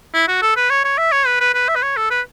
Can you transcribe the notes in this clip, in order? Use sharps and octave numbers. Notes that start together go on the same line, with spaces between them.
E4
F#4
A4
B4
C#5
C#5
E5
C#5
B4
B4
B4
E5
B4
C#5
A4
B4